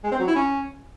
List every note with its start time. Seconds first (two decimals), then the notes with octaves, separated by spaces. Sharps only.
0.04 G#3
0.12 C4
0.20 F#3
0.28 E4
0.35 C#4